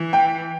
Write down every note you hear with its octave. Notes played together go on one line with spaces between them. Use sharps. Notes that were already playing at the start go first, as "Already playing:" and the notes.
Already playing: E3
G5